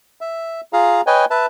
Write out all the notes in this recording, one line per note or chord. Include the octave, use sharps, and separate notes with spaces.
E5
F4 G#4 F5 A#5
B4 C#5 D#5 G5 G#5
B4 E5 A5